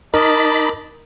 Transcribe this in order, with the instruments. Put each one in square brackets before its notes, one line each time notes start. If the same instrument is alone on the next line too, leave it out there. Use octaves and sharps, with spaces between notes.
[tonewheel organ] D#4 B5 [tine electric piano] A#4 [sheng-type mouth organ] D#5 A5 D6